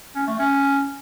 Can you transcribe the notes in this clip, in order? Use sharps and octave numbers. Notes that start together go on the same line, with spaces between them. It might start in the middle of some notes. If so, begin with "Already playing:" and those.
C#4
A3
C#4